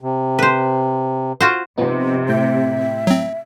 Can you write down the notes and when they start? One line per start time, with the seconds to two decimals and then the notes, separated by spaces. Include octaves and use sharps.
0.01 C3
0.39 B4 C5
1.41 F4 F#4 C5
1.78 C3 F3 B3 D#4
2.29 A2 E5 G5
3.07 F#3 C4